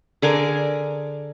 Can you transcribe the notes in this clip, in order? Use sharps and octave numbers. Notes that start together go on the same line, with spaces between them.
D3 G#4 A#4 D6